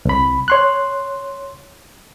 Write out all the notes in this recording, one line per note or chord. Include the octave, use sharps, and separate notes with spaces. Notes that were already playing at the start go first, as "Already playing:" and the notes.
C2 B5
C#5 C6 F#6